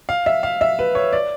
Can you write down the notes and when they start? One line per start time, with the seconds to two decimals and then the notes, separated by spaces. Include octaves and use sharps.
0.09 F5
0.26 E5
0.43 F5
0.61 E5
0.79 B4
0.95 C#5
1.13 D5